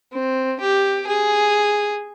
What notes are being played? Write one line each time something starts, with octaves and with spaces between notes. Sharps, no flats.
C4
G4
G#4